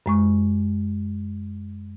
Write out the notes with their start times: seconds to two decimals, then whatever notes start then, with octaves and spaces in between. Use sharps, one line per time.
0.06 F#2 G#3 C#6